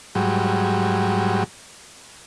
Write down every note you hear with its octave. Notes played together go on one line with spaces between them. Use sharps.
G#2 F#3 G3